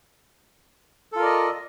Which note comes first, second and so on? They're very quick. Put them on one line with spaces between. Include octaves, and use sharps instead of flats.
A4 F4 A#4 D5 D#5